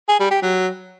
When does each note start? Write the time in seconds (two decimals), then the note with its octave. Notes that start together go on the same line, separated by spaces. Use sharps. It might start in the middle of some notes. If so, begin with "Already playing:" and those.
0.09 G#4
0.20 G3
0.31 G4
0.42 F#3